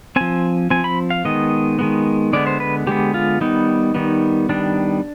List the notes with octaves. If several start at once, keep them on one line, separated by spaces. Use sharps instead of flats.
F3 C4 G#5
F3 C4 G#5
B5
F5
D#3 G#3 B3 D#5
D#3 G#3 B3
D3 G#3 B3 D5
C5
B4
D3 G#3 B3 G4
F4
D#3 G3 B3 D#4
D#3 G3 B3
D#3 G3 B3 D4